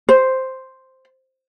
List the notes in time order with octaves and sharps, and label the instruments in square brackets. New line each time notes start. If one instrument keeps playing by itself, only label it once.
[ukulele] C5